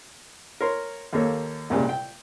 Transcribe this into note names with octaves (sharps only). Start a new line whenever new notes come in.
A#4 C#5 C6
D#2 A#3 A4 C#5
C2 G2 A#2 C#3 G3 G#3
G5